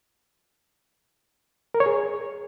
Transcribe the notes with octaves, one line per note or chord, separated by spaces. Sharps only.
A#4
C#5
G#4